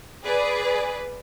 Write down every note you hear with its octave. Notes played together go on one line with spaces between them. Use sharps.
G#4 B4 D5